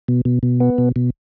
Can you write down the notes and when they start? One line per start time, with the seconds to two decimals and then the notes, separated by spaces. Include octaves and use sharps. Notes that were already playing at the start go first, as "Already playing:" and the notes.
0.08 B2
0.25 B2
0.43 B2
0.60 B3
0.78 B2
0.96 B2